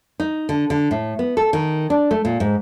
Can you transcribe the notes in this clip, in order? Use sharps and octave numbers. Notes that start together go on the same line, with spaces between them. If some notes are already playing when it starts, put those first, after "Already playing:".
D#4
D3
D3
A2
B3
A4
D#3
D4
A3
A#2
G#2